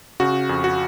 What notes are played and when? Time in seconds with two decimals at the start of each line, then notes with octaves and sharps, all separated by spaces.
0.20 C#3 F#4
0.49 F2
0.64 F#4